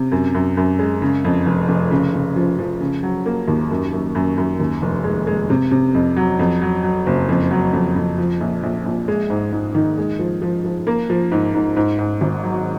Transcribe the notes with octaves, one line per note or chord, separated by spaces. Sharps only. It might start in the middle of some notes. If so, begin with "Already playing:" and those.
Already playing: C3
F#2
F#2
F#2
G#3
C#3
F2
F1
F1
C#3
C#3
F3
F3
C#3
F#3
A#3
D#2
F#2
F#2
F#2
F#2
D#2
F1
G#3
G#3
C3
C3
F2
F#3
F2
F#3
F#3
F#1
F2
F#3
F2
F2
F3
A#1
A#1
A#1
G#3
G#2
G#2
D#3
G#3
F3
F3
F3
A#3
F3
G#2
G#2
G#2
G#2
G#1
F#3